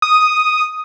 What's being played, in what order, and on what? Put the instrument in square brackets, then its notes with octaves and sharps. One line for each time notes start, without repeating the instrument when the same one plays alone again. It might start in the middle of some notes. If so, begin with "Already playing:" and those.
[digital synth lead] D#6